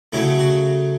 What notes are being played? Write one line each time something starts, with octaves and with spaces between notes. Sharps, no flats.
C#3 F#3 A3 E4
F#4